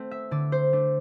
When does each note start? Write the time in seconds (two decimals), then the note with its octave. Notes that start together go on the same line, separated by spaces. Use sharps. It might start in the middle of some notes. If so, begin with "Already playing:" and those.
Already playing: A3 C4
0.11 E5
0.31 D3 D5
0.52 C5
0.73 A3 D4